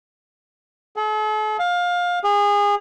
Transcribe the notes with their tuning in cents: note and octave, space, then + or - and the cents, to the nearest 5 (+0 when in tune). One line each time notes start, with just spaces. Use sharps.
A4 -45
F5 +20
G#4 -25